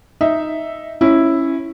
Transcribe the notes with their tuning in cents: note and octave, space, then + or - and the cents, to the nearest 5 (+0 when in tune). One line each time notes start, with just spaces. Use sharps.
D#4 +0 E5 +0
C#4 -15 E4 +0